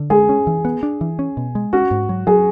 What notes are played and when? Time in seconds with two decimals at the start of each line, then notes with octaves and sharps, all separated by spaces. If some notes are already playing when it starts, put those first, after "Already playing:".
Already playing: D3
0.10 G#3 G#4
0.29 C#4
0.47 E3
0.65 B3
0.83 D4
1.01 E3
1.19 C#4
1.37 B2
1.55 G#3
1.73 C#4 F#4
1.91 G#2
2.09 F#3
2.27 F#3 G#4